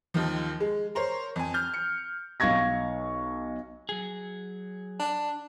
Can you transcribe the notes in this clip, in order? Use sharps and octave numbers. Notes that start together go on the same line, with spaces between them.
D#2 D#3 F3
G#3
A#4 C5 C#5
F2 G#5
F6 G6
C#7
B1 F5 C#6 G#6 A#6
F#3 G#4
D4